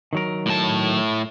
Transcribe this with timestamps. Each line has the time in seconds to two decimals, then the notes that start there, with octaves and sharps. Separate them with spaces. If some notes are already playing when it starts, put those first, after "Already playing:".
0.13 D#3 F#3 A#4
0.46 A2 A5